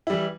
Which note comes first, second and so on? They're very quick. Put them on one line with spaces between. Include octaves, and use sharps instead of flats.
E4 G3 E3